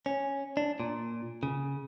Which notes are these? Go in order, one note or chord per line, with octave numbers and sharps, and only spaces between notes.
C#4
D4
A#2
C#3